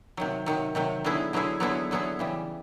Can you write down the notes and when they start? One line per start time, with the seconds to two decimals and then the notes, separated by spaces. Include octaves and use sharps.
0.17 C3 D#3 F#3
0.46 C3 D#3 F#3
0.75 C3 D#3 F#3
1.04 D3 F#3 B3 E4 G#4
1.33 D3 F#3 B3 E4 G#4
1.60 D3 F#3 B3 E4 G#4
1.91 D3 F#3 B3 E4 G#4
2.19 C#3 E3 G3